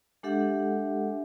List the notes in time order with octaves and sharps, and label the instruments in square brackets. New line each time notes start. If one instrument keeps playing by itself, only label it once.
[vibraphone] G#3 D4 G4 A4 E5 F#5